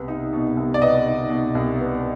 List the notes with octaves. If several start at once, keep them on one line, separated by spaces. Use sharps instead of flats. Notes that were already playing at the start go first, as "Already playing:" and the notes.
Already playing: C2 B2 B3
D#4
B2
C2
D5
B3 D#5
D#4
B2
C2
B3